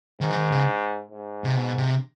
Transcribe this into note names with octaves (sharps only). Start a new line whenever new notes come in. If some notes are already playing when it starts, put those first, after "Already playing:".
G#2 D#3
E3
D#3
C#3
G#2
C3
B2
C3